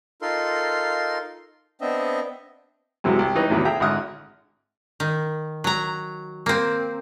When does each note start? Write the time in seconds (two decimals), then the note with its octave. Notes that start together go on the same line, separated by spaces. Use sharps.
0.22 D#4 F4 A4 A#4 C6
1.81 B3 C4 D4 D#5 E5
3.04 F#2 C3 E3 F#3 G#3
3.19 C2
3.35 E3 D#4 B4 C#5
3.49 E2 A2 C3 D#3 E3 F#3
3.65 G#4 A4 E5 G5 A#5
3.80 G#1 D3 E4 F#5 D#6 F6
5.00 D#3
5.64 F#3 A#5
6.46 A#3 C4